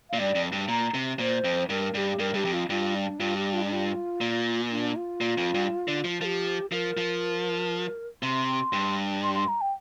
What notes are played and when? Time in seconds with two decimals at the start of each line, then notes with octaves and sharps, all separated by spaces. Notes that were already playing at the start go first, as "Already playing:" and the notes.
0.10 A#2 F5
0.18 G2 D5
0.35 F2
0.52 G2
0.68 A#2 A#5
0.94 C3
1.19 A#2 C5
1.44 F2
1.69 G2 A#4
1.94 G2 G4 A#4
2.19 G2 A#4
2.34 G2 G4
2.45 F2
2.53 F4
2.70 G2 F4
2.95 D4
3.19 G2 F4
3.37 G4
3.53 F4
3.62 D4
3.72 F4
4.21 A#2
4.71 D4
4.96 F4
5.21 A#2
5.38 F2
5.54 G2
5.88 D3
6.05 F3
6.21 F3 G4 A#4
6.71 F3 A#4
6.97 F3
8.23 C3 C6
8.73 G2
9.23 C6
9.35 C6
9.48 A#5
9.61 G5